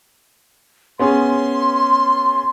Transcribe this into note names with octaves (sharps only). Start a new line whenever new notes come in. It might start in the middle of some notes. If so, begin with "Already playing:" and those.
B3 C#4 G#4 C6